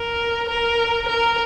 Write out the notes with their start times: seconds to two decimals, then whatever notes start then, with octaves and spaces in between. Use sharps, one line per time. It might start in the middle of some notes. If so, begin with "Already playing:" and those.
Already playing: A#4
0.49 A#4
1.08 A#4